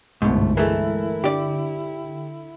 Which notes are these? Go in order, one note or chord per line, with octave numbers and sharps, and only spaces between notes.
G1 C2 G#2 B2 A3
E3 G#3 A3 E4 A#4
D3 G4 D5